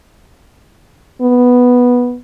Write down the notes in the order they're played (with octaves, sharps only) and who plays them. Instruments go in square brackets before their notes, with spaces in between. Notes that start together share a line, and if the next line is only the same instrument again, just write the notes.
[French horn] B3